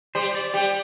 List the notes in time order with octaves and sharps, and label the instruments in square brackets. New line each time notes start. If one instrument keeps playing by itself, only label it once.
[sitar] G3 [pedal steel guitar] C5
[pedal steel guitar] D5
[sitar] G3 [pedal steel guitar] G4